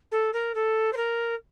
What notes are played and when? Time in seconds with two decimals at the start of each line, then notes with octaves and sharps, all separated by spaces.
0.11 A4
0.33 A#4
0.54 A4
0.92 C5
0.96 A#4